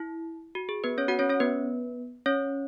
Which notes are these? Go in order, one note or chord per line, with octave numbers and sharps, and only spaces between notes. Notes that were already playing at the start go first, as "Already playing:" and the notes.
Already playing: E4
F#4
G#4
B3 B4
C#4 C#5
F#4 F#5
C#4 C#5
C#4 C#5
B3 B4
C#4 C#5